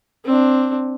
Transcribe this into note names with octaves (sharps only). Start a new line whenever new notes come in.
C4 D4